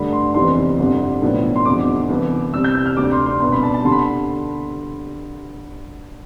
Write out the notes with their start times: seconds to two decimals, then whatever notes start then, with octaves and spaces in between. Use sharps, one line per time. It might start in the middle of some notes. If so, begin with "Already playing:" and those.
Already playing: G2 D3 A3 D4 B5
0.13 C6
0.34 F1 E2 C3 E3 G3 C6
0.78 G1 F2 D3 G3
1.22 B1 A2 F3 B3 D4
1.56 C6
1.65 F1 E2 D3 G3 D6
2.09 C2 C3 E3 B3
2.54 C2 C3 G3 C4 E6
2.64 G6
2.75 G6
2.86 F6
2.97 D2 C3 G3 D4 D6
3.12 C6
3.26 C6
3.40 C2 B2 B3 D4 C6
3.52 B5
3.63 A5
3.74 A5
3.84 D3 G3 C6
3.92 B5